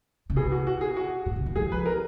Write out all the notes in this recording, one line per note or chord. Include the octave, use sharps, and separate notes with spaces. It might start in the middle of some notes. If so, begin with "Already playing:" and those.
C#3
B2 G#4
F#4
F#4
G#4
F#4
A#2
C#3
D#3
F3 G#4
B4
A#4